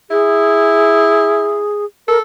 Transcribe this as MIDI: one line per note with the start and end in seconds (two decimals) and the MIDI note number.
0.10 1.67 64
0.10 1.85 68
2.08 2.21 69
2.08 2.17 70